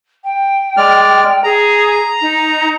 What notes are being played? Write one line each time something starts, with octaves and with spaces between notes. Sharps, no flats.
G5
G#3 D5 F6
G#4 A#5
D#4